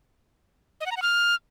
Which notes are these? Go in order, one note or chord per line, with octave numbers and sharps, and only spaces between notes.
D#5
F#5
A#5
F#5
F6